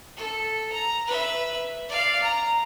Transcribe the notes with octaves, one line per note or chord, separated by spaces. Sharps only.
A4
A#5
B4 E5
D5 F5
A#5